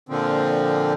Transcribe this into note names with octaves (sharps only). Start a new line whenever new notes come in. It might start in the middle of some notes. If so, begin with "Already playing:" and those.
A#2 D3 F3 C4